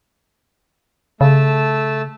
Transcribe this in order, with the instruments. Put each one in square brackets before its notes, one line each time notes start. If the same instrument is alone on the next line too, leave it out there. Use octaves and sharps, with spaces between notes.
[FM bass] C#3 [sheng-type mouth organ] A3 A5 E6